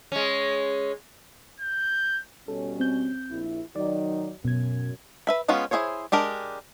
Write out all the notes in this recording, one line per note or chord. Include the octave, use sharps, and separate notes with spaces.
G#3 C#4
G6
B2 G3 C#4 A4
C4 G6
A#1 E4
D#3 F#3 D#4 D5
F#2 B2 G#6
B4 E5 B5
G#3 B3 C#4 F4
E4 F#4 G#4 C5 C#5
G#3 D4 G4 A#4